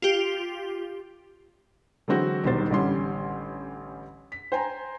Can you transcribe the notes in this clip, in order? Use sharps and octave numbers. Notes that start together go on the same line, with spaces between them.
F4 G4
D3 E3 F#3 G#3 C4 F#4
D#1 B1 D#3 G3 C5 A6
A1 D3 E3 G3 C#4 C6
B6
C5 G5 G#5 A#5